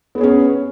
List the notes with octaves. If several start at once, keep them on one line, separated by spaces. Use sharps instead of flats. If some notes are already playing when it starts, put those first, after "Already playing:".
B3 C#4 G#4 C#5